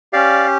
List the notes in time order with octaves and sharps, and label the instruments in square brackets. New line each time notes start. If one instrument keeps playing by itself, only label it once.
[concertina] C#4 G4 D5 F5